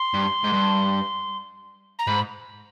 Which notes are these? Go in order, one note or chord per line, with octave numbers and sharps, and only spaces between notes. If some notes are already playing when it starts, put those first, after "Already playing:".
Already playing: C6
G2
G#2
G2
A#5
G#2 B5